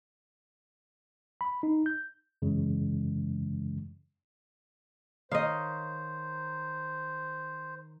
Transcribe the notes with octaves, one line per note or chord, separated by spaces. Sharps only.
B5
D#4
G6
F#2 C#3 E3 G#3
D#3 C5 C#5 D#5 F5 D#6